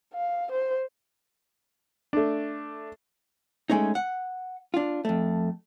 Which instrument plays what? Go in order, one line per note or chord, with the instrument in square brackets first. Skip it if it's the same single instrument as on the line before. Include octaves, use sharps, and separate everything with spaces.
[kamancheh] F5
C5
[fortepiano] A3 D4
[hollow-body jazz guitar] G#3 A3 C#4 D#4
F#5
D4 F4
F2 A3